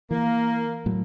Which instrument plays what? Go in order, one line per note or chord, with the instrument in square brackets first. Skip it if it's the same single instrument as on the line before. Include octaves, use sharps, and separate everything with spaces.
[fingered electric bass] E3 [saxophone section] A#3
[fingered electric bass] A2 F#3